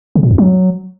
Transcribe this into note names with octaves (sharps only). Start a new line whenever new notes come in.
C#3
A#2
F2
F#3